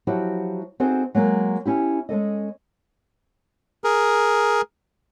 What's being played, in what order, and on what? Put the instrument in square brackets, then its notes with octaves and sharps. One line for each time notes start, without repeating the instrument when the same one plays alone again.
[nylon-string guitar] F3 F#3 E4 F#4 G4
C4 D#4 F#4 G#4 A4 C5
F#3 G#3 A#3
C#4 E4 G4
G#3 C#4 A4 D#5
[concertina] G#4 A#4